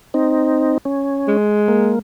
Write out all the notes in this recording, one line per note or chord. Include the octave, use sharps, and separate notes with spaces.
C4 D#4
C#4
G#3
A#3